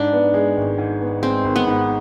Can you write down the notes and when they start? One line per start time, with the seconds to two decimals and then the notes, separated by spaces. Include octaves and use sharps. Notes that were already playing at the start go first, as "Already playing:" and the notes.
Already playing: G#2 D4
0.13 B3
0.34 G#3
0.57 G#1
0.78 G#2
1.01 B3
1.23 G#3 C4
1.45 G#1
1.56 B3
1.67 G#2